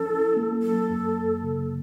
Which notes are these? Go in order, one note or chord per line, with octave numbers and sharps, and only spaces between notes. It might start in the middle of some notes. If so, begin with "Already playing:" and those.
Already playing: F3 C#4 A4
E4
A#3
F#3 A4
F#2
F#2
C#3